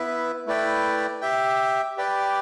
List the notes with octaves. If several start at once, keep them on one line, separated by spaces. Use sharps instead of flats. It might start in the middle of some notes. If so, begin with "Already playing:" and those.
Already playing: B3 E4 B4 E5
A3 E4 B4 D5 G5
G4 E5 G5
G4 B4 D5 G5